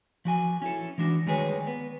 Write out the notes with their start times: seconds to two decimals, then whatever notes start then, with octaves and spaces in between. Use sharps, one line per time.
0.25 F3 F#4 G#5
0.62 C#4 E4 A4
0.98 E3 G#3 D4 F#4
1.27 D#3 G3 G#3 G#4 B4 C#5
1.67 B3